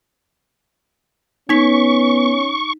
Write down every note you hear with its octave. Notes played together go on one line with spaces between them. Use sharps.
B3 C#4 D#4 C#6 B6